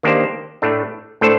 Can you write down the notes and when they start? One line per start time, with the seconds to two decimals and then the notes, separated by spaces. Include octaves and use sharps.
0.03 D#3 A#3 D4 G4 C5
0.62 A2 A3 D4
1.21 A2 A3 D4 A4 C5